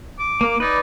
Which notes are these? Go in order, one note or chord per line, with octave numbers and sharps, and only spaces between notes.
D6
A#3
D#4 B4 D5